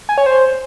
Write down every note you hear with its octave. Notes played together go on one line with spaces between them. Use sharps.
G#5
C#5
C5